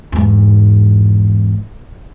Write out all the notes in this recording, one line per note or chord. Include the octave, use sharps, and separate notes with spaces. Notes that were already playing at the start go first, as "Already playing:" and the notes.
E2 G#2